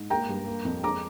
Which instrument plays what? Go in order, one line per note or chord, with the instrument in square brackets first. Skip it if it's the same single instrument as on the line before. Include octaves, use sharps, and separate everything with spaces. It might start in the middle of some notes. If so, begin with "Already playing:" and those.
Already playing: [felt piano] G#2
A#3 G5 A#5
G2
A#3
F2
G#3 A#5 D6